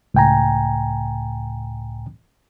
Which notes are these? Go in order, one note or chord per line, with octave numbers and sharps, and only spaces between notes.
C#2 A2 G5 G#5 A#5